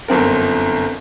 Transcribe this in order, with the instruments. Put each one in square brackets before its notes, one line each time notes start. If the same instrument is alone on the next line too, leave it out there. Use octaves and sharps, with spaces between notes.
[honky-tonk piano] G1 F#2 C4 A#4